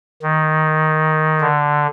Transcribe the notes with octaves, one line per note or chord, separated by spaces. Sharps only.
D#3
D3